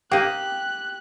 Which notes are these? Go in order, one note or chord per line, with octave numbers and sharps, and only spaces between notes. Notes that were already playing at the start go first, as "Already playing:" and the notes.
A#3 D#4 G4 F#6